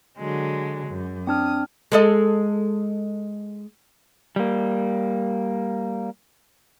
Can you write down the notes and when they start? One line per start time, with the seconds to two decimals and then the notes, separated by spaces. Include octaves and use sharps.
0.18 D3 F#3 G#3
0.89 F#2
1.27 C4 D4 D#6 F6
1.92 G#3 A4 D#5
4.36 G3 A#3